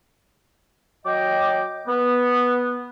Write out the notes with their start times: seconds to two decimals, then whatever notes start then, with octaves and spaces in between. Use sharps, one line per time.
1.06 F#3 D#5 G5 D6
1.88 B3